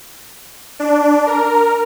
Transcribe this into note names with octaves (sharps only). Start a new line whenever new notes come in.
D4
A#4